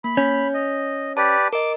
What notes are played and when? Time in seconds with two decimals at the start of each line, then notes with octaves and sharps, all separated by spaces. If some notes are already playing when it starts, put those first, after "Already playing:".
0.04 A#3 B5
0.17 C#4 G6
0.54 D#5
1.17 G4 B4 D5 A5
1.53 A#4 D#5 D6